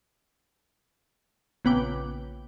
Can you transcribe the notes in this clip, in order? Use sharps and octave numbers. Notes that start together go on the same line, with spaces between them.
A#1 C#3 B3 B4 G5 D6